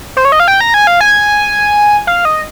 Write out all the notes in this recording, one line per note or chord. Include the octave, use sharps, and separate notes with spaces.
C5
C#5
D#5
F5
G5
A#5
G#5
F5
G#5
F5
D#5